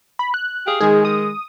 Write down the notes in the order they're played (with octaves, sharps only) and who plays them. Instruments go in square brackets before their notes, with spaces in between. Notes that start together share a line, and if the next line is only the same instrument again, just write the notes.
[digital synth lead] B5
F#6
[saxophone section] G4 G#4 F5
[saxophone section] D#3 G#3 [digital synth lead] G#4
[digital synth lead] D#6